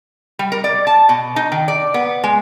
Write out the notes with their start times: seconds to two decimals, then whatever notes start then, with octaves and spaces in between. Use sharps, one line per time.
0.39 G3
0.52 A#4
0.64 D5
0.87 A5
1.09 B2
1.36 D#4
1.52 D#3
1.68 D5
1.94 B3
2.24 G#3